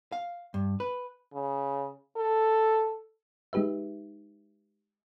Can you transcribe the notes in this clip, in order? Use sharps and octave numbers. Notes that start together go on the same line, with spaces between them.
F5
G2
B4
C#3
A4
G#3 D#4 G4 B4 E5